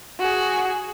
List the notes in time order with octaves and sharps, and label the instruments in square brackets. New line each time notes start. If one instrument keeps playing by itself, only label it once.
[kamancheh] F#4 G#4